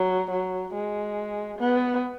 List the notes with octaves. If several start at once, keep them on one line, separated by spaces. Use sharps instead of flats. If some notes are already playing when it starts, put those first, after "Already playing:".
Already playing: F#3
F#3
G#3
B3